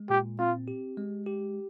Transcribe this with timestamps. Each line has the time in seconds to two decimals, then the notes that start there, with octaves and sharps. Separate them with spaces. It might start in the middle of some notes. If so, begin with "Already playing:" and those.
Already playing: G#3
0.10 A#2 G4
0.38 C4 F4
0.68 G4
0.97 G#3
1.26 G4